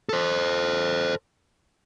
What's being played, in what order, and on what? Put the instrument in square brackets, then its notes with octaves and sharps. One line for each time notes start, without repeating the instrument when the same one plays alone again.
[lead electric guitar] A4 C5